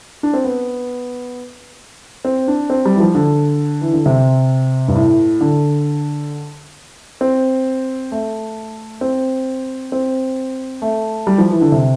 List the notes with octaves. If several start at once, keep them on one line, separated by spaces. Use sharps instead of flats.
D4
C4
B3
C4
D4
C4
G3
E3
F3
D3
E3
D3
C3
G2
A2
D3
C4
A3
C4
C4
A3
G3
F3
E3
D3
C3